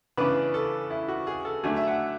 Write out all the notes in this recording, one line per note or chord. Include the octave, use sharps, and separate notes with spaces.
C#3 E3 B3 D4 B4
A4
E4
F#4
G#4
A4
D3 F#3 A3 D4 G#5
E5
F#5